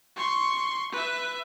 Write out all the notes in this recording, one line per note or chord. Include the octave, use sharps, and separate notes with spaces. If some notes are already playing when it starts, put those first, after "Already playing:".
C6 C#6
B4 E5